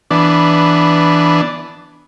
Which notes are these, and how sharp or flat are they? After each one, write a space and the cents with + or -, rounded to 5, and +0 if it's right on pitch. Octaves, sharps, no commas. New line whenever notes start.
E3 +0 B3 -5 D4 +0